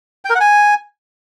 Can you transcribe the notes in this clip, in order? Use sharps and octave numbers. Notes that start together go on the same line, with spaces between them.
G5
A#4
F#5
G#5